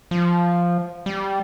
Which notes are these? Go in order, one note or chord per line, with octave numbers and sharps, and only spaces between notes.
F3
G3